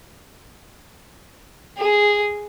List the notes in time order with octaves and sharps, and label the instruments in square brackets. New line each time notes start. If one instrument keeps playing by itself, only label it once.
[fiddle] G#4